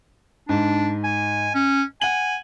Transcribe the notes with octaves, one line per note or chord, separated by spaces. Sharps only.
G#2 D4
G#5
C#4
F#5 G#5 F#7